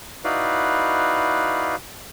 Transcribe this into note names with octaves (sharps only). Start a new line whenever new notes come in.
D#4 E4 F#4 B4 D5 F5